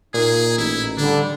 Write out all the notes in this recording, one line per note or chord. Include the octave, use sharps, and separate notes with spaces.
A#2 D#4 G#4
A1 D#4 E4
D3 G3 D4